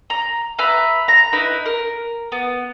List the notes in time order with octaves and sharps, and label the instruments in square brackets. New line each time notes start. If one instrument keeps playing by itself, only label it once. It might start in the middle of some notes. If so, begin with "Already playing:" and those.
[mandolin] A#5
B4 E5 A#5 B5
A#5
D#4 E4 B4
A#4
B3